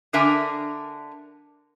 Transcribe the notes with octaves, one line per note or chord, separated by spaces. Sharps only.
D3 D4 A#4 E5 G#5